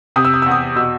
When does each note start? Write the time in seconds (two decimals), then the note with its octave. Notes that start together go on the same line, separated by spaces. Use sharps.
0.16 C3 D#6
0.25 E6
0.34 D#6
0.42 E6
0.46 E2
0.51 D#6
0.76 B2 E6